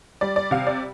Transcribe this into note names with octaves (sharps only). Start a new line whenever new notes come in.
G3 D5
D5
C3 F5
D5